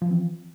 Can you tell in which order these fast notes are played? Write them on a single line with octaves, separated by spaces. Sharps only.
F3 E3 C4